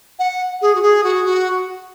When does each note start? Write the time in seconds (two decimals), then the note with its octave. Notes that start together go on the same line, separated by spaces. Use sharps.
0.19 F#5
0.61 G#4
0.75 F#4
0.82 G#4
1.03 F#4
1.25 F#4